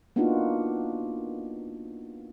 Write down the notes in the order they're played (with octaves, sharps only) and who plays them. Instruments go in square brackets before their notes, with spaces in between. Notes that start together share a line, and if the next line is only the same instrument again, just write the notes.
[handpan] A#3 B3 D4 D#4 F4 F#4